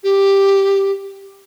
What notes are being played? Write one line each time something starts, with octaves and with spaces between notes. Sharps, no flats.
G4